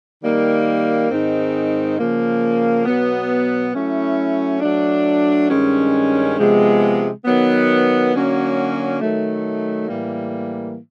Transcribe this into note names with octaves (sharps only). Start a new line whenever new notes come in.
D#3 G3 A#3
G#2 D#3 G#3 C4 D#4
C#3 F3 A#3
B2 F#3 B3
F#3 A3 C#4 E4
F#3 A3 D4
G2 D#3 G#3 C#4
C3 F3 G#3 B3
D#3 F#3 B3
D3 F#3 A#3 C#4 F#4
D#3 F#3 A3
A2 E3 G3 A#3